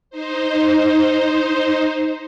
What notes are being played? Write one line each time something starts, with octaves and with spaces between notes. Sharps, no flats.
D#4 C5